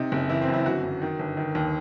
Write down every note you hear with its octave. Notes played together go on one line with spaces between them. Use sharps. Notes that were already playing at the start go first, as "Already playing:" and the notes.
Already playing: C3 D#4
F#1
E3 E4
C4
F#2
E4
G1 F#4
F#2
D#3
G1
D#3
D#2